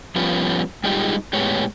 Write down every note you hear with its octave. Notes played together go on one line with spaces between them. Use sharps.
F3 G3 B3 C#4 F4
G3 G#3 D#4 F4 G4 G#4
A2 G#3 B3 G4 C#5